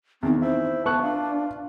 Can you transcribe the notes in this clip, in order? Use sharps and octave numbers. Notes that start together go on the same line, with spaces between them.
E2 D#3 C4
E4 C5
B3 A5 C#6 F#6
D4 F4